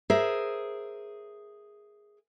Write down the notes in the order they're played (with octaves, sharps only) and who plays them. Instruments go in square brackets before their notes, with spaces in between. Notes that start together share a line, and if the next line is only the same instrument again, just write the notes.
[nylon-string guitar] G#4 A#4 C5 E5